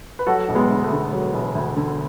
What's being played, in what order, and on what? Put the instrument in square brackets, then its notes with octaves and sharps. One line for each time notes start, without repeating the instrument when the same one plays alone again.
[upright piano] B4
F#3 F#4 A4
E1
G#3 B3
D2
A3
D3
F#3
E1
D2
D3